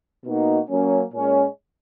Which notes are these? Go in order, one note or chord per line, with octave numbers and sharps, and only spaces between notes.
B2 A#3 D#4 F#4
F#3 A#3 C#4
A#2 G#3 C#4